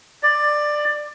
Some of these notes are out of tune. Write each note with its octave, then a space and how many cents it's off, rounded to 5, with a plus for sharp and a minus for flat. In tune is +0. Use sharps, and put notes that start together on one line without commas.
D5 +15